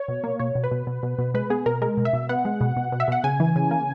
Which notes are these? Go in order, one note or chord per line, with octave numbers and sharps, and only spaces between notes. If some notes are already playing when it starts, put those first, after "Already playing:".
Already playing: C#5
B2
A#3
B2 C#5
B2
B4
B2
B2
B2
B2
G#3 B4
B3 G#4
B2 A#4
G#3 A#4
B2
E5
B2
B3 F#5
G#3
B2
B2
B2
E5
B2 F#5
C#3 G#5
E3
C#3
A#3